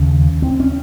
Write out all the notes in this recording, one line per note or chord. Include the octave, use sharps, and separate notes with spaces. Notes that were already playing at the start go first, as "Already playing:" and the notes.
Already playing: D#2 C#3 C#4
C4
C#4